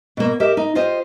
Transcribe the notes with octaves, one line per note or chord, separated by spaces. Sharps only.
B2 A#3
G4 A#4 D#5 E5
D#4
F4 G4 C5 D#5